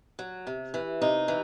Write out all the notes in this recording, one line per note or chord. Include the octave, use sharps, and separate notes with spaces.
F#3
C3
E3
C3 D#4
E3